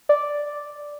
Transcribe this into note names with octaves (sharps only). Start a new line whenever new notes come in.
D5